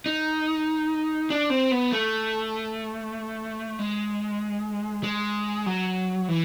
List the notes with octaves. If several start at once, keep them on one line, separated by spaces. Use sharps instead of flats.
D#4
D4
C4
B3
A3
G#3
G#3
F#3
E3